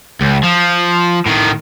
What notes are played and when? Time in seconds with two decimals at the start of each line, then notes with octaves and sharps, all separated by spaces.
0.21 C#2
0.43 F3
1.26 A2 D#3